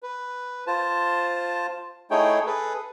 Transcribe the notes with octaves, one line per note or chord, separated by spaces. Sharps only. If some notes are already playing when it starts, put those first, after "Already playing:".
B4
F4 C5 A5
A3 D#4 E4 G#4 C#5 G5
G#4 A4 B4